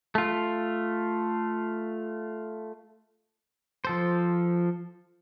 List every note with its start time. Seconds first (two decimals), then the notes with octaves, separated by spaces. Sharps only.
0.15 A3 F4
3.85 F3 A4 C5